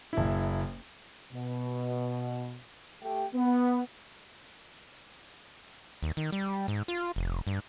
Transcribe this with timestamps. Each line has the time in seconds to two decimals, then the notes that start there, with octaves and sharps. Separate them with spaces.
0.13 F#1 E4
1.32 B2
3.03 A3 G4 G5
3.34 B3
6.03 D#2
6.17 D#3
6.32 G3
6.68 G#2
6.88 F4
7.16 F1
7.47 G2